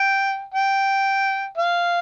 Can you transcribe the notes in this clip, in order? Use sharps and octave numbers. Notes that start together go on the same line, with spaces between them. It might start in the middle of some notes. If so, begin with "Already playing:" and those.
Already playing: G5
G5
F5